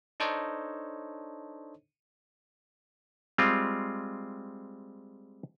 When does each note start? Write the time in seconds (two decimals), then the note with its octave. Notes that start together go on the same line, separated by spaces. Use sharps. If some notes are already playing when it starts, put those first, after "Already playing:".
0.20 D4 D#4 A4 C5 C#5 D#5
3.38 G3 G#3 C4 F4